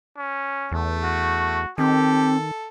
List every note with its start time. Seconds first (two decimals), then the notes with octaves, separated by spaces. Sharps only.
0.17 C#4
0.72 E2 A3
1.03 F#4
1.78 D#3 C4 G4 A4